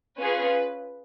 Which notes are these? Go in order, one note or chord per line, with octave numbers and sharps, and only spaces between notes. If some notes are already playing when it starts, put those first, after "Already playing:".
C#4 F4 G#4 B4